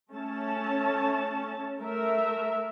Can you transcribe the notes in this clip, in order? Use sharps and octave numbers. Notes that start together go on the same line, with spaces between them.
A3 C#4 A5
A3 A#4 E5